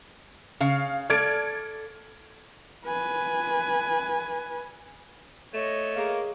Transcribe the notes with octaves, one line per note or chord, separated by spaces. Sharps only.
C#3 F5
A4 D5 F6 G#6 D7
B4 G#5
A3 C#5 D#5
A#3 G#4